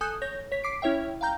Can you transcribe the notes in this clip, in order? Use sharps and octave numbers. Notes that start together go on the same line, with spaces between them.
A4 G#5 D#6 F#6 G6
C#5 G6 A#6
C#5 B6
D6 B6 C7 D7
C#4 E4 C#5 E5 G5
F5 G5 A#5 G6